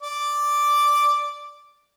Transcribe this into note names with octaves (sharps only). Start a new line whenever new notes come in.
D5 D6